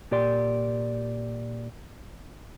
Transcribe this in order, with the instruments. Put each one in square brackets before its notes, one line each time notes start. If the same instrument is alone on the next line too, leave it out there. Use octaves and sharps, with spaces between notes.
[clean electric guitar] A#2 G4 D5 C6